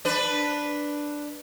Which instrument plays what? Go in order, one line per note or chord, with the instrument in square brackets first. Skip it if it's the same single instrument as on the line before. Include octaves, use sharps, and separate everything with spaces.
[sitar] D4 B4